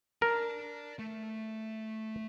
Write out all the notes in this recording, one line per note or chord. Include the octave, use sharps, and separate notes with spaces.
A#4 D5 A5
A3